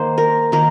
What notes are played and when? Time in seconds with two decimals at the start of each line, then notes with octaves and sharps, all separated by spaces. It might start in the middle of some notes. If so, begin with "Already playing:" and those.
Already playing: D#3 A#3 C5
0.18 A#4
0.52 D#3 A#3 A#4